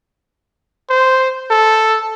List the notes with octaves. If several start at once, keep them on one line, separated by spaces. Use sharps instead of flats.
C5
A4